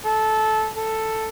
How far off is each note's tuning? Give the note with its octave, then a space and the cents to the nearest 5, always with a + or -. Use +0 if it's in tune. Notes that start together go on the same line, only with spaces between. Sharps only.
A4 -15
A4 +5